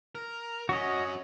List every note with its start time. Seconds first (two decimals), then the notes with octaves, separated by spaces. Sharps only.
0.15 A#4
0.69 F#3 C#4 F#4 D#5